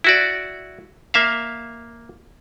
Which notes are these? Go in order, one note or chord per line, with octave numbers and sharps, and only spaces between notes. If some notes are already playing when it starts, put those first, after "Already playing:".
E4 F#4 D5
A#3 E5 F5